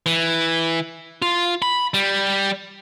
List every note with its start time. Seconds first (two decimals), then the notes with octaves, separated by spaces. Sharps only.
0.06 E3
1.22 F4
1.62 B5
1.94 G3